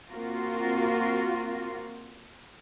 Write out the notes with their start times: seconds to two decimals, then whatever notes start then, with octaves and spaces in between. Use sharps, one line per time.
0.11 A#3 C4 F4 F#4 A#4